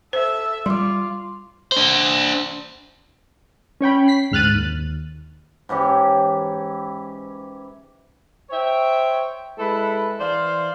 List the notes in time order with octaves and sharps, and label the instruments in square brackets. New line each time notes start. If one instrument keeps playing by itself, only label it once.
[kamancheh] A4 E5 [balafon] C5
[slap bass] G3 [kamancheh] F4 [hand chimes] C6 D6
[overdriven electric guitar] D4 C5
[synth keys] C#4 C#5 G5 B5
B6 C7
D2 G#2 F6 F#6 A6 D#7
D#2
[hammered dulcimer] G#2 E3 C#4 G4
[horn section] C5 C#5 E5 G5
G#3 E4 A4 B4
E3 C5 D5 F5